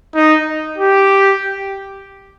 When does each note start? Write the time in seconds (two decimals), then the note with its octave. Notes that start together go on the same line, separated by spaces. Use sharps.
0.15 D#4
0.78 G4